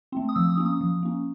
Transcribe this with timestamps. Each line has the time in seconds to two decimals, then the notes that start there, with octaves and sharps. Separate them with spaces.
0.12 A3 C4
0.29 D#6
0.35 F3 E6
0.50 D#6
0.58 A#3 C#4
0.65 D#6
0.81 F3
1.03 A#3 C#4